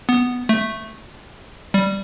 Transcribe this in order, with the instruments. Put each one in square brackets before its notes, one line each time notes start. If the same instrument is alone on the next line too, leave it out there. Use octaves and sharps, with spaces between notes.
[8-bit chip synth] B3
A3
G3